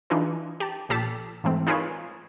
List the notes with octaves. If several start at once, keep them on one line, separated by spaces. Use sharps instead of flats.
E3 D4 D#4 F4 G#4 B4
G4 A5
A#1 A#2 G4 A4 A5 B6
G#2 E3 A3 C4
D#4 F4 G#4 A#4 B4 C#5